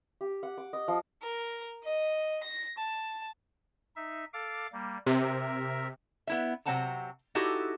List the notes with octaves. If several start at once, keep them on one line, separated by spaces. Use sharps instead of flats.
G4
F#5
D6
D#5
F3
A#4
D#5
A#6
A5
D#4 E5
A4 F5 D6
G3 A#3
C3 A#4 E5
B3 E4 E5
C3 F#3 C4 F#5 A5 A#5
D#4 E4 F#4 G4 A4